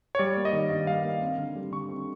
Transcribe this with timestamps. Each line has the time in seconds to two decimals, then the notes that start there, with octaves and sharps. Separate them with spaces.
0.15 C#5
0.19 G3 D5
0.37 A#3
0.45 D#5
0.53 D#3
0.70 G2 D#5
0.87 G3 F5
1.04 A#3
1.21 C4
1.38 D3
1.55 G3
1.72 D3 C#6
1.88 C4